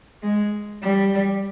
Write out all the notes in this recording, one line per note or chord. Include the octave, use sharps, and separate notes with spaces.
G#3
G3